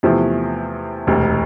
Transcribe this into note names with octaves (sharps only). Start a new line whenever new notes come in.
E2 C3 F3 A3 E4
E1 D2 C3